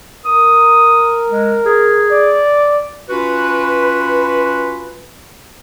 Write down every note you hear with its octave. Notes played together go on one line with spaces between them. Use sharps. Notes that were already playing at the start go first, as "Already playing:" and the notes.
A#4 D#6
G#3
G#4
D5
C#4 F4 F#4 B4